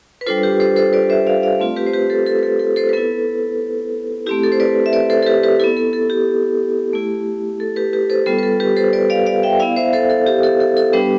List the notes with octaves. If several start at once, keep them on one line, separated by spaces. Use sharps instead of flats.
B4
G3 D4 F4 A4 C5
G4 B4
A4 C5
A4 C5
B4 D5
C5 E5
D5 F5
D5 F5
A3 C4 F4
G4 B4
C5
G4 B4
A4 C5
A4
B4
A4
A4
A4 C5
B4
B3 E4 A4
A3 C4 E4 G4
A4
C5
B4 D5
E5
B4 D5
A4 C5
A4
G4 B4
G4 B4
B3 E4 A4
A4
A4
G4
A3 E4
A4
G4 B4
G4 B4
A4 C5
G3 B3 F4 A4
B4
A4
G4 B4
A4 C5
B4 D5
D5 F5
D5 F5
E5 G5
B3 E4 D5 F5
C5 E5
A4 C5
A4
G4
A4
A4
A4
G3 B3 D4 G4 B4